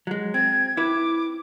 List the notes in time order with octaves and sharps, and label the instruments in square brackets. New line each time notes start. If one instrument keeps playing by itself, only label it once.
[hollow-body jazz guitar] F#3 G#3
[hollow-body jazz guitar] C4 [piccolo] G#6
[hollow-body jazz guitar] E4 B4 [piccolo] D6